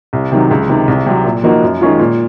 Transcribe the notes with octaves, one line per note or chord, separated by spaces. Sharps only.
C2
C3 D#3 F#3
C#2
C3 D#3
C2
C3 F#3
A#2
F3 A#3 D#4 F#4
F#2
D#3 G#3 C#4 F4
A#2